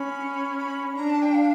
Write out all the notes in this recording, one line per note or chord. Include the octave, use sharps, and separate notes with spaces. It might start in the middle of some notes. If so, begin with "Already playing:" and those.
Already playing: C#4 B5
B5
D4 A#5
A5
G5
F5